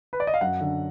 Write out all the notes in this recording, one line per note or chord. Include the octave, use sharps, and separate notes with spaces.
B4
D5
D#5
F5
F#2 F#5
D3